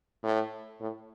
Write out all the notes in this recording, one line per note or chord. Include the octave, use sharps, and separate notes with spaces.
A2
A2